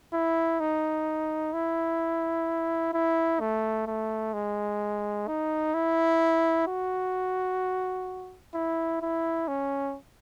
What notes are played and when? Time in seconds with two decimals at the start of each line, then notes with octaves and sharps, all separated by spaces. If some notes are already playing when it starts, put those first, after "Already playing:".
0.13 E4
0.60 D#4
1.53 E4
2.93 E4
3.40 A3
3.87 A3
4.33 G#3
5.27 D#4
5.74 E4
6.67 F#4
8.54 E4
9.02 E4
9.48 C#4